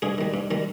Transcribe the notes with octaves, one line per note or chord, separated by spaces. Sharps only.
G2 G#4
D#3 G3
G2
D#3 G3